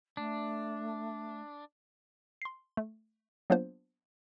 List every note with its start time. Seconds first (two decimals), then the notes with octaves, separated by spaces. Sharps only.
0.17 A3 D4
2.42 C6 C7
2.77 A3
3.50 F#3 A#3 B3 D4 F4 C5